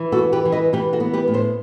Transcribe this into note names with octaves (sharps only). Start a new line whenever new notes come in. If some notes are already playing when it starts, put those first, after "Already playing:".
Already playing: E3
F#4 A4
B3
G4 B4
E3
B4 D#5
E3 G4 B4
F#4 A4
B3
G4 B4
A2
A4 C5